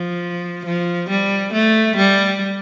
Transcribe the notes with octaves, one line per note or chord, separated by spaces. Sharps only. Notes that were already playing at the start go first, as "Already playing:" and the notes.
Already playing: F3
F3
G3
A3
G3